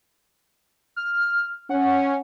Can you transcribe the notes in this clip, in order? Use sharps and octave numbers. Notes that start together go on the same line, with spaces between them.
F6
C#4 F#5